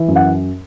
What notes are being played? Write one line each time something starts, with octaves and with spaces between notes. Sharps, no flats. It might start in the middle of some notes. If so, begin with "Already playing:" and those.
Already playing: E3
F#2
F#5